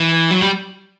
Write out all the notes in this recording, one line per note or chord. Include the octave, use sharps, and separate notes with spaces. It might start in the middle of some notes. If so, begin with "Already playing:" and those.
Already playing: E3
F#3
G3